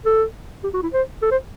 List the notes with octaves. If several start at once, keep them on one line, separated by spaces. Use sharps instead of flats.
A4
G4
F#4
E4
C5
A4
C5